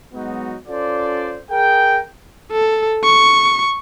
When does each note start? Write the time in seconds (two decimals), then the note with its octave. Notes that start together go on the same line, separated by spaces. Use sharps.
0.13 F#3 G#3 B3 D#4 F#4
0.68 C#4 F4 A4 C5 D5
1.51 G#4 A#4 G5
2.53 A4
3.04 C#6